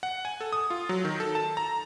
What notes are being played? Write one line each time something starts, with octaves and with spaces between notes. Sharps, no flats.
F#5
G#5
A4
D#6
F4
F#3
D#3
A4
A5
A#5